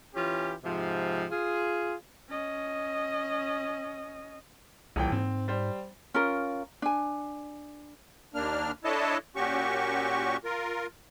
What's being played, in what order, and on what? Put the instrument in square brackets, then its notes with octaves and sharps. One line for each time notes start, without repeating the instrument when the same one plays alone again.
[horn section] E3 C#4 F4 G4
G#2 C3 F3
F4 G#4
[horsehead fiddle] C#4 D#5
[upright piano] D#1 E3 G5 [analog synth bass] C2
[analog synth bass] G#2 [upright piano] C4
[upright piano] G3 C5
[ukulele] C#4 F4 A#4
D4 G#5
[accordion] D#2 A#3 D4 F6
D4 E4 A4 C#5 D#5 A5
A#2 C#4 F#4 G4 C#6
F4 A#4